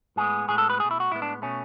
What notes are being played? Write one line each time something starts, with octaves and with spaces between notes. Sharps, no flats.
A2 G#3 B3 G#4
A2 G#3 B3 G#4
A4
B4
B2 A3 G#4
E4
F#4
A2 G#3 B3 E4
D4
B2 A3 C#4